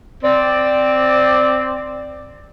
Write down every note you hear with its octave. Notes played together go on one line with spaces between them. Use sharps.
C4 D5